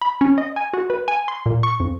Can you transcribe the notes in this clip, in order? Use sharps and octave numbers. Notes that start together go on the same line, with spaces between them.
B5
C#4
D#5
G#5
F#4
B4
G#5
C6
A#2
C#6
F2